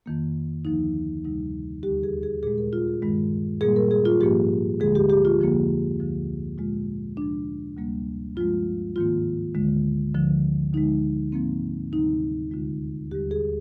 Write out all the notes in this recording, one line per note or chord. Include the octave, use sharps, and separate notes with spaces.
F2 D#3 A#3
D2 D3 F3 A#3 D#4
D2 C3 G3 D#4
D#2 D3 G3 G4
G#4
G#4
A#2 G#3 G#4
A#4
F4
G#4
G2 D#3 G#3
A#2 G3 A#3 G#4
A#4
G#4
F4
G#2 F3 A#3 G4
D2 D3 G#3 G#4
G4
G4
F4
F2 D3 F3 A#3
D2 D3 F3 G#3
A#2 G#3 F4
D2 C3 F3 D4
D2 C3 G3 A#3
G2 F3 G#3 F4
G#2 D#3 A#3 F4
D2 D3 G#3
D2 D3 F3
D2 D3 G#3 D#4
G#2 F3 A#3 C4
D2 C3 D#3 G3 A#3 D#4
D#2 D3 G#3 F4
D#2 D3 G3 G4
G#4